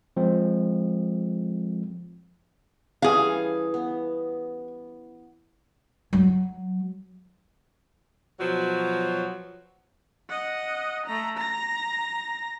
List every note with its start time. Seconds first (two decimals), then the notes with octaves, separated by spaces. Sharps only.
0.17 F3 G#3 C4
3.02 E3 G3 C#4 G#4 F5
3.74 B3
6.13 F#3
8.40 B2 F3 F#3
10.29 D#5 F#5
11.05 A3 A#5
11.37 A#5 A#6